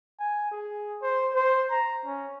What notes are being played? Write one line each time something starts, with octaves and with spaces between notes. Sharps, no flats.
G#5
G#4
C5
C5
A#5
C#4